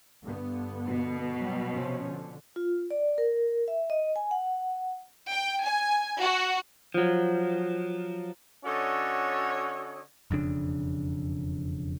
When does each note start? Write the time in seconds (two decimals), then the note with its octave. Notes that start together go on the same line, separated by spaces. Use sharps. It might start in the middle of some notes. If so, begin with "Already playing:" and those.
0.23 G2 D3 B3
0.87 B2
1.38 F#3 G3
1.73 C3 F3 C#4
2.07 D3
2.56 F4
2.91 D5
3.18 A#4
3.68 E5
3.90 D#5
4.16 G#5
4.31 F#5
5.29 G5
5.64 G#5
6.19 F#4
6.94 F3 F#3
8.65 D3 C#4 F#4 A4 C#5 D#5
10.31 E1 F2 C#3 D4